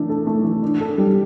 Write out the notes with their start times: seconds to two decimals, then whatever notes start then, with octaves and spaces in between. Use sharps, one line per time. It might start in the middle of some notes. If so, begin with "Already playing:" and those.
Already playing: E3 A3 D4
0.09 A4
0.27 A3
0.44 E3
0.63 D4
0.80 A4
0.98 G3